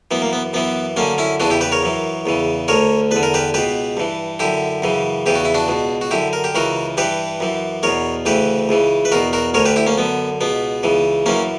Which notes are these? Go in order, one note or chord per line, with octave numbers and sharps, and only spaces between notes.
F#2 E3 B3
A#3
B3
F#2 E3 B3
F#2 D3 A#3 C#4
C#4 E4
E2 C#3 E3 D4 F#4
E4 G4
G4 B4
A#4 C#5
F#2 E3
E2 C#3 E3
D2 D3 A#4 C#5
E2 D3 B4
A#4
G4 B4
C#2 B2 G4 B4
G2 E3
F#2 D3 E4 G4
F#2 C#3 E3
E2 C#3 E3 G4
F#4
E4
D4 F#4
C#2 B2
F#4
F#2 D3 E4 G4
A#4
G4
C#2 C#3 E3 F#4 A#4
G2 E3 G4 B4
F#2 E3
E2 B2 A#4 C#5
D2 C#3 E3 G4 B4
C#2 C#3 E3
B4
E2 B2 F#4 A#4
F#4 A#4
D2 D3 A#4 C#5
G4 B4
E4 G4
A#3 C#4
F#2 D3 B3
C#2 B2 B3
C#2 C#3 E3
F#2 E3 A#3 C#4